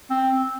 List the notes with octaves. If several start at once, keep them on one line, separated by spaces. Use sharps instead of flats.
C4